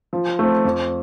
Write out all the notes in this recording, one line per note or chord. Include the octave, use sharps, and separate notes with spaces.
F3
A3 C4
F2